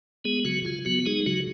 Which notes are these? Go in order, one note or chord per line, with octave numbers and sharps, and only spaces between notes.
G#3 B3 G#4
C#3 F#3 F#4
C#3 F4
F#3 B3 F#4
G#3 D#4 G#4
C#3 F#3 F#4